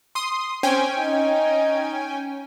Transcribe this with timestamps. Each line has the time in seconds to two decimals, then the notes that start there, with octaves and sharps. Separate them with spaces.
0.15 C6 D#6
0.63 C4 C#4 G5 G#5
0.98 D#4